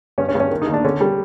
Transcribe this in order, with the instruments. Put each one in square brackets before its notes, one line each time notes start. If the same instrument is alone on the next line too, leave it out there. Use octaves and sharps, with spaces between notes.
[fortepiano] G2 C#4
C#4
G2
C#4
D#3
D#4
D#2
D4
D3 C#4
G3